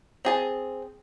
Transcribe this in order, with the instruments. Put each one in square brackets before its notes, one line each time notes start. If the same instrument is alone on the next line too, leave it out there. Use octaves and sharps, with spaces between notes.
[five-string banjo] C4 G#4 A5